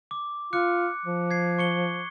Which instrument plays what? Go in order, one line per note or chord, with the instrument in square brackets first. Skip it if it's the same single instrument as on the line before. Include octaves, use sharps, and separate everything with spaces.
[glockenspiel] D6
[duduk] F4 [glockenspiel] D6 F#6 C#7
[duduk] F3
[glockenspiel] G#6 C7
C#6 C#7 G7